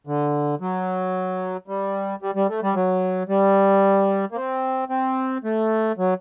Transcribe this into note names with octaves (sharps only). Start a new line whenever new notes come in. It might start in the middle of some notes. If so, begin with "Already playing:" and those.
D3
F#3
G3
G3
G3
A3
G3
F#3
G3
A#3
C4
C4
A3
F#3